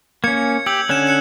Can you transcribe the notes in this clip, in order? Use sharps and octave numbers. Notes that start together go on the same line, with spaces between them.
A#3 C#4 G#6 C#7
G4 E6 G6 F#7
D3 C#4 F#6 E7
F#6 C#7 E7